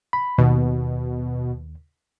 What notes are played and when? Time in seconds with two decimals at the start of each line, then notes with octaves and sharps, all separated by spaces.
0.13 B5
0.38 D#2 B2